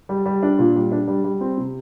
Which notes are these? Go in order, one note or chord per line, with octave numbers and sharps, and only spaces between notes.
G3
G3
D4
A#2
G3
D4
G3
G3
C4
C3